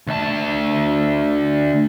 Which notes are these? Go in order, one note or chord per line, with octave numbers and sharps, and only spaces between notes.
D2 A5